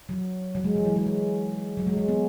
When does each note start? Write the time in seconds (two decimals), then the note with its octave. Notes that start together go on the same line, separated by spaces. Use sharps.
0.09 F#3
0.55 F#3
0.64 G#3
0.75 E3
0.85 F#3
0.96 G#3
1.06 G#3
1.77 F#3
1.87 G#3
1.97 G#3
2.08 B3